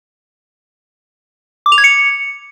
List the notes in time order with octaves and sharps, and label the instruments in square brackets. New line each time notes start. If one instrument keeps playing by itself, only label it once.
[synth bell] D6
F7
G#6
C#7